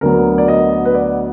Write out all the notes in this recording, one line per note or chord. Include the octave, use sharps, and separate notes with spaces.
D2 D3 F#3 B3 A#4
D5
D#5
B4
D5